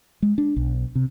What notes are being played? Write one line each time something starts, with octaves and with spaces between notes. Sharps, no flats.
G#3
D4
B1
C3